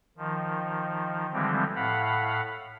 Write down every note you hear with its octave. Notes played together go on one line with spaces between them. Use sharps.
D#3 F3
D3 E3 F3 G3 G#3 C4
A2 F5 F#5 B5